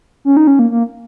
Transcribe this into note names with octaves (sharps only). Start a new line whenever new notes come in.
C#4
D#4
C#4
A#3
A#3